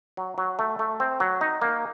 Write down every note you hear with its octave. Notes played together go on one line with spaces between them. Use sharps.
F#3
F#3
A3
A3
C4
F#3
D#4
A#3